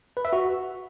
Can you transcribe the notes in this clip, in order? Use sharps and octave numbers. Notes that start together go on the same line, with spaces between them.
B4
E5
F#4